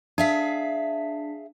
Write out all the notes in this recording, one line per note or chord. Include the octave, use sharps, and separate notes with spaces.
D4 G#4 E5 F5 B6